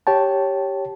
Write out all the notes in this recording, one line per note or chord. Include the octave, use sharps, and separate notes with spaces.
G4 C#5 G5 A5